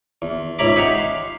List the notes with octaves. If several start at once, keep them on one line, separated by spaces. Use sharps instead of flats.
E2
C#2 G#2 E4 A#5 B5 D6
G4 D#5 E5 F#5 G#5 A#5
F5 C6